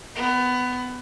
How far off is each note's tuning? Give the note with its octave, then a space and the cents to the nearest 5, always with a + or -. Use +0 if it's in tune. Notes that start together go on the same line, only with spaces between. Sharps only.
B3 +20